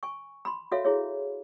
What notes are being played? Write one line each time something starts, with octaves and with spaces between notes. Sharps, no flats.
G#5 C#6
B5 C6
F#4 A4 C#5 E5 F5
E4 G#4 C#5